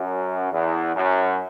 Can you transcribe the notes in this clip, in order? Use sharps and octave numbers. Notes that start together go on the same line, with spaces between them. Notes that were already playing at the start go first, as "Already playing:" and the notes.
Already playing: F#2
E2
F#2